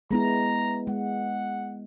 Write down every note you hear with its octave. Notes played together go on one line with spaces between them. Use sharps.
G#3 B3 E4 A#5
G#3 F#5